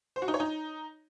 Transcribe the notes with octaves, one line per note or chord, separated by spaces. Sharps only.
C5
F#4
D#4
C#5
D#4